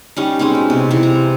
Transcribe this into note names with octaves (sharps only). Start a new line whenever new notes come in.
G3 C#4 D#4
G#3 C4 C#4 D#4
B2
C3
C3 E3
A#5